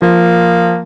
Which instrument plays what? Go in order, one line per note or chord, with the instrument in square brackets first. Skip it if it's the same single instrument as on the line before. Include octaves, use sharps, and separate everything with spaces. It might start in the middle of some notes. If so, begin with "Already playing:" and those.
[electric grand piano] F3 [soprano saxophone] A#3